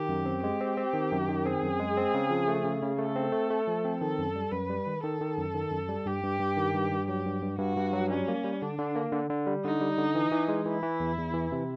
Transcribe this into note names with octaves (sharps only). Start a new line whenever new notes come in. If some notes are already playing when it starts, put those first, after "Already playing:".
Already playing: D#3 G4
F#2
C4
G#3 G4
C4
C4
D#3
F#2
D#3
C4 G#4
F#2
G#3
C4
C#3
F3
A3
C#3
C#3
A3 A4
C4
A3
A3
F3
C4
D#3 A4
F#2
G3
F#2 B4
G3
D#3
D#3 A4
D#3
F#2
D#3
F#2
G3
G2 G4
G2
G2
D#3
G2
G2
F#3 G4
G2
G2
G2 F#4
G2
F#3
G3 C#4
A#3
G3
D3 D4
D3
A#3
D3
D3
G3
D3 D#4
G3
D3
E3
E3
G#3
E3 E4
E3
E2
E2
E3
C3